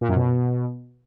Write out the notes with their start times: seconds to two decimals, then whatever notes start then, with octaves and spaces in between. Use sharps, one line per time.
0.01 A#2
0.09 F#2
0.16 B2